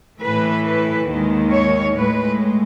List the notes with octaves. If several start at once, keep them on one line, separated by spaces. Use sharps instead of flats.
A2 E3 A3 B4
B4
D#2 D#3 G#3
C#5
A2 G#3 B4